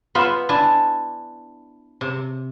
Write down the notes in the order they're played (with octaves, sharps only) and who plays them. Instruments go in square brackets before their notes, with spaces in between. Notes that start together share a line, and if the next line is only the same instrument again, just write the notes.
[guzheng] B3 F4 C5 E5 F#5 B5
D4 E4 G#5 A5
C3